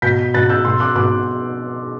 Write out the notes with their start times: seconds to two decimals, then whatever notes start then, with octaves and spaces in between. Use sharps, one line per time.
0.02 B2 G6 B6
0.34 B2 F#6 A6
0.49 E6 G6
0.65 B2 C6 E6
0.80 D6 F#6
0.96 B2 D6 F#6